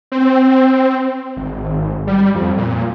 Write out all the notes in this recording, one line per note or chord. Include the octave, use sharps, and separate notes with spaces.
C4
G#1
G3
F2
A#2